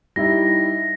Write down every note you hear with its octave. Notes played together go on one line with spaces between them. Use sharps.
G3 D#4 E4 A#6